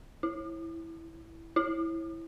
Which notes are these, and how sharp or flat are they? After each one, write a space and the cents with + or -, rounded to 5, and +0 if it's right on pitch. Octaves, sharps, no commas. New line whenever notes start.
E4 +0
E4 +0